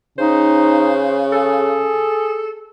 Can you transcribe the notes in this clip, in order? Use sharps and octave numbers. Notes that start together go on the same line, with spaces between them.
C#3 D#4 C5
G#4 A4